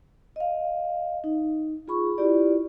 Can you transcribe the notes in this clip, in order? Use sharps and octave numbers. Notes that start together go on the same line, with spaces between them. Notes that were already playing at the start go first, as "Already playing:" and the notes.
D#5 F5
D#4
F4 G#4 B5 C#6
E4 F4 G4 D5